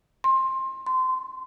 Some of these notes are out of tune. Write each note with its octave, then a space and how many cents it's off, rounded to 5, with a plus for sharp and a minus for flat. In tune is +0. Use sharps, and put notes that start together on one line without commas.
C6 +20
C6 -20